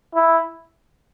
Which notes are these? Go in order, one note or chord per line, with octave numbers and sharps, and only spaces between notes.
E4